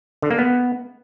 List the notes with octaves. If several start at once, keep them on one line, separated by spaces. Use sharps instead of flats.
D3
A#3
B3